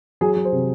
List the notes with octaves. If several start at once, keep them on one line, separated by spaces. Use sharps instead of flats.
F#3 G#4
F#3
C5
C3